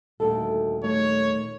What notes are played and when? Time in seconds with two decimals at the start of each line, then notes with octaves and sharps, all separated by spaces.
0.20 D#1 D2 D#3 A4
0.84 D#3 A3 C#5